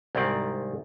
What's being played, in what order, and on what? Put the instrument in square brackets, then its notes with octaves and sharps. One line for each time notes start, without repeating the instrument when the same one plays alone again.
[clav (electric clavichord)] C2 G#2 D#3 C4 D5